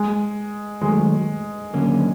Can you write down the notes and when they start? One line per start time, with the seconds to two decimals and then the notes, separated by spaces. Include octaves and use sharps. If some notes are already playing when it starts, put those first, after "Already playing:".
Already playing: G#3
0.82 D#3 F#3 G#3 A3
1.74 D#2 D3 F#3 A#3 C#4